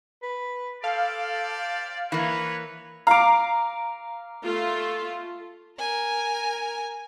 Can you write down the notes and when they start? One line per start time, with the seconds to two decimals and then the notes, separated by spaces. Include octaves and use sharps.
0.23 B4
0.84 G4 A4 C5 D5 F5
2.12 E3 A#3 B4 C#5 B5
3.07 F5 A#5 D6
4.44 A3 F4
5.79 A#4 G#5